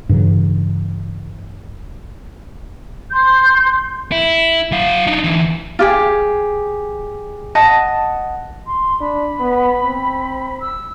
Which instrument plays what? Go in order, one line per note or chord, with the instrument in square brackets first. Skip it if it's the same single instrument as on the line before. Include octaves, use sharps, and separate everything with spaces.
[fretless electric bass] G2 C#3 E3 F#3
[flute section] C6 G6
[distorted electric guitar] E4
F#3 F5
D4 D#4
D2 E3
[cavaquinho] F4 G4 G#4
D#5 F#5 A5
[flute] C6
[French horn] D4 [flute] B5
[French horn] B3
C4
[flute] E6